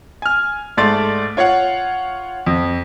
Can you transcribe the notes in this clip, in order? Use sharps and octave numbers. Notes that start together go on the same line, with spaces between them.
G#5 F6
G#2 A3 D5 C6 A6
F4 C#5 F5 F#5
F2